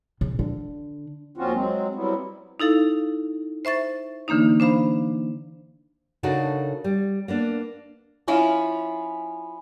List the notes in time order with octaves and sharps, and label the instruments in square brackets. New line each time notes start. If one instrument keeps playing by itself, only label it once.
[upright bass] C#3
D3
[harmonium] D#2 F3 C4 C#4 F4 F#4
F#3 G#3 C4
F#3 G3 B3 C4 E4
[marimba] D#4 E4 A4 F5
C5 E5 C#6 A6
D3 E3 A#3 D4 D#4
D4 C5 F5 B5
[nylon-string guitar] C#3 D4 D#4 F#4 A4 A#4
G3
A#3 B3 D4
[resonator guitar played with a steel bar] F3 C#4 E4 F4